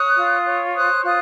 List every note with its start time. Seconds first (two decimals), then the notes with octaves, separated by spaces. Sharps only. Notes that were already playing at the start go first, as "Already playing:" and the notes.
Already playing: C#5 D#6 F#6
0.16 F4
0.46 C#5
0.75 C5 D#6 F#6
1.04 F4 D#6 F#6